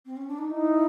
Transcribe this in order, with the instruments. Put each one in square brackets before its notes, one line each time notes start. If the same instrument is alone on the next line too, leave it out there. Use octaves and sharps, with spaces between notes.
[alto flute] C4
C#4
D4
D#4
[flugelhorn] D#4 [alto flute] E4